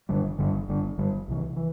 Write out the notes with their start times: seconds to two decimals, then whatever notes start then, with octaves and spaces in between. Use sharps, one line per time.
0.09 G1 G2 D3 G3
0.39 G1 G2 D3 G3
0.68 G1 G2 D3 G3
0.98 G1 G2 D3 G3
1.28 C2 C3 E3
1.56 E3